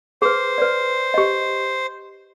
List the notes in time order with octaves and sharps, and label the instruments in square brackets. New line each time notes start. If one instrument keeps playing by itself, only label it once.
[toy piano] G#4 B4 [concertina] C5
[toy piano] B4 D5
G4 D#5